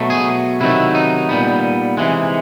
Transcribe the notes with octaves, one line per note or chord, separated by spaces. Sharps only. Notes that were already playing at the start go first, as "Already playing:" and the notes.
Already playing: B2 F#3 A3
G#4
C3 D#3 F#3 A3 E4
D#4
A#2 G3 B3
C3 E3 G#3